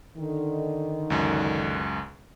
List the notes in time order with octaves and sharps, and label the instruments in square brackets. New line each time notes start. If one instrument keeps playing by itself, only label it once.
[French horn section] D3 D#3
[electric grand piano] C#2 F#2